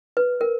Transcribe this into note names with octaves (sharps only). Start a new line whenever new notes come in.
B4
A#4